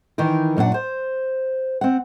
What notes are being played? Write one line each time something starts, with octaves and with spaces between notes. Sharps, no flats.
D#3 E3 D#4 A#4
F#2 A#2 D4 F#5
C5
C4 F#5